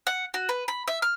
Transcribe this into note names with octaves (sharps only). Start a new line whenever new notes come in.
F#5
F#4
B4
B5
E5
F6